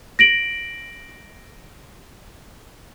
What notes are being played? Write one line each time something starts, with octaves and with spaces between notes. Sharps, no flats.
A#6 D7 F#7